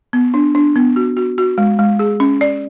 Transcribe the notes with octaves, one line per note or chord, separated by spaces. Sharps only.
B3
D4
D4
B3
F#4
F#4
F#4
G#3
G#3
G#4
C#4
D5